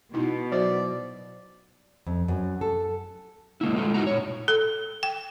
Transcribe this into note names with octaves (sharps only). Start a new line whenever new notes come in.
B2 D#4 E4
F#3 F#4 C5 D5
F2
F#2
A4
G#3 A#3 E4
G#3 A3 F4
G2 D#4 E4 F#4 A#5
A#2 C#5
A4
G5